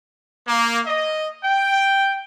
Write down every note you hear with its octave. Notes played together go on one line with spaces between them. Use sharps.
A#3
D#5
G5